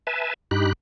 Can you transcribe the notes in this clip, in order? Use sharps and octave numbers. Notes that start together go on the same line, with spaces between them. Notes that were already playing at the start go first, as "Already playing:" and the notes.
B4 E5 G#5 A5
G2 D#4 G4 B5 F#6